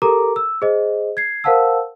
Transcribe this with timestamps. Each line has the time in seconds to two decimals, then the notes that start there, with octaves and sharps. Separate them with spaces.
0.02 G4 A4 A#4 A#5 D6
0.36 E6
0.62 G#4 C5 D#5
1.17 G#6 C7
1.44 A#4 C5 F5 F#5 A5 E6